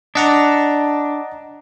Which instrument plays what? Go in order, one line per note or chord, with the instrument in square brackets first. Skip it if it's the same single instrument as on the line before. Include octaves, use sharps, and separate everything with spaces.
[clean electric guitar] D4 [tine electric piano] D#5 F#5 A#5